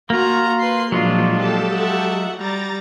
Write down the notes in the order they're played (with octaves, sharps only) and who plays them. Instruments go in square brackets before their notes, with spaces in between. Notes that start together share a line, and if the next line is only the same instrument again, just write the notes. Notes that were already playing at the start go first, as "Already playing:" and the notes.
[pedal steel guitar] A#3 F4 [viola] F#4 A#5
[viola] B4 C6
[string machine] A#2 F3 [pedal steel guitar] F#3 G#3 F4 [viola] D4
[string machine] G4 A4 A5
[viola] E5 F#5
[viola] G3 [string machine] A#5 A6